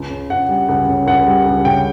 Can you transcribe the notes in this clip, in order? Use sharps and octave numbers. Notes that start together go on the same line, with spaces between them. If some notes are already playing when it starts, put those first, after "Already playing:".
Already playing: C#2
C#3
C#2 F#5
G3
C#2 F#5
C#3
C#2 F#5
G3
C#2
C#3 G5